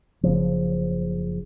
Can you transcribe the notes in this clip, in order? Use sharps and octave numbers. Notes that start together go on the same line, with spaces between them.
F#1 C#3 F3